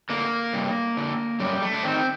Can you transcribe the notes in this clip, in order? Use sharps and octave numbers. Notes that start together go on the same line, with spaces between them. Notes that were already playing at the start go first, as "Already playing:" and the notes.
D3 A#3
G2
D3
F#2 G3
A3
D4
D#3 C4